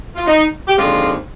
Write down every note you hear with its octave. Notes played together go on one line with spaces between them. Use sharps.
F4
D#4
G4
D#2 D3 F3 G#3 C4 F4